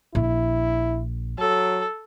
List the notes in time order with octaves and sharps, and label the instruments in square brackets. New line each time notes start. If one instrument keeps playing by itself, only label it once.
[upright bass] A#1 [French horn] E4
[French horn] F#3 [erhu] A4